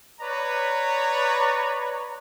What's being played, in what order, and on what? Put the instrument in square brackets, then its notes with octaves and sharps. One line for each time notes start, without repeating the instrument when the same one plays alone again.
[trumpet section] B4 C#5 D5 A#5